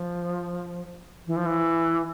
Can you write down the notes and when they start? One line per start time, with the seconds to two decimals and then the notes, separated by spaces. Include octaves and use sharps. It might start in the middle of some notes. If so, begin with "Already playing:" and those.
Already playing: F3
1.27 E3
1.37 F3
1.46 E3